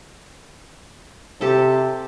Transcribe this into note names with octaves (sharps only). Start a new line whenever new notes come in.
C3 G4 A4